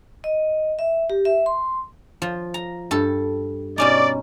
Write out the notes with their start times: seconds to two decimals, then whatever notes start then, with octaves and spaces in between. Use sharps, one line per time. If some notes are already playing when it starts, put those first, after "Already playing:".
0.24 D#5
0.79 E5
1.10 G4
1.25 E5
1.46 C6
2.22 F3
2.54 A#5
2.91 G2 A4
3.78 B2 C#4 D#4 D5